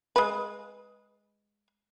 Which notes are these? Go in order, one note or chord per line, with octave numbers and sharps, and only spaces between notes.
G#3 B4